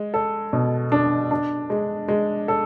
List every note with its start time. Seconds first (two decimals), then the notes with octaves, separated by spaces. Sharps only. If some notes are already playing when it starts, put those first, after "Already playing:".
Already playing: G#3
0.14 A4
0.53 B2
0.92 D4
1.31 D4
1.70 G#3
2.08 G#3
2.48 A4